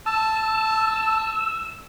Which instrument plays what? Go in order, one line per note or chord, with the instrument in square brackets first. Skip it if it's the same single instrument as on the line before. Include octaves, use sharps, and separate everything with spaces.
[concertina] A5 [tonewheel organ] E6